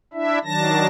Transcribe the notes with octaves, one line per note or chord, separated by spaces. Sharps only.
D4 E4 E5
D#3 F#3 D4 A5 A#6